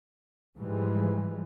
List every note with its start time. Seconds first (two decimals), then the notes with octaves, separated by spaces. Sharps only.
0.57 G#2 E3 F3 G3 G#3